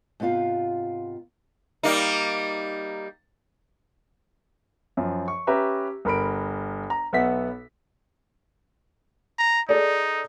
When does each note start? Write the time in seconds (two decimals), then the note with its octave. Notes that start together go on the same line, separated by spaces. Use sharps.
0.20 G#2 C3 B3 F4 F5
1.83 G3 A#3 D#4
4.97 F#2 F3
5.28 C#6
5.47 C#4 G4 B4 E5 A#5
6.05 G1 A#4 B5 D7
6.90 A#5
7.13 B1 B3 E5 F#5 B6
9.39 A#5
9.69 D#4 G#4 A4 D5